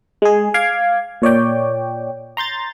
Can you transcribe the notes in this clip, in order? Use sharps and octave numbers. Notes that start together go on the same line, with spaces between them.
G#3 G#4
F5 D6 G#6
A#2 C#5 D5 G5
A#5 C6 G6 A6